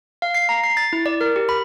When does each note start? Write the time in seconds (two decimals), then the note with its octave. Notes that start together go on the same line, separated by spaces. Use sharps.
0.22 F5
0.34 C7
0.49 A#5
0.64 C7
0.77 A6
0.93 E4
1.06 D5
1.21 A#4
1.36 G4
1.49 B5